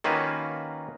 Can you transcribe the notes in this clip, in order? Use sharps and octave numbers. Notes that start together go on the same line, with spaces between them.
D#3 A#3 C#4 F4 F#4 B4